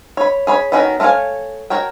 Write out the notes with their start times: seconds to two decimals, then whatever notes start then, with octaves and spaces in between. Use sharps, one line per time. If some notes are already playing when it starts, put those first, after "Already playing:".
0.17 C#5 B5
0.47 G#4 C#5 B5
0.72 D#3 B3 C#4 F#4 A#4
1.00 A3 A#4 C#5 F5 G#5
1.70 F#4 A#4 C#5 G5